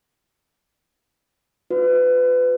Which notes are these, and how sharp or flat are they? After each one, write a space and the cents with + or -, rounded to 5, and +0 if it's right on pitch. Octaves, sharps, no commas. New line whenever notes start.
F4 +45 B4 +25